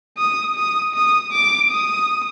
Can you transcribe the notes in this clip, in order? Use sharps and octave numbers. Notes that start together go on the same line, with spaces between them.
D#6
D#6
D#6
D6
D#6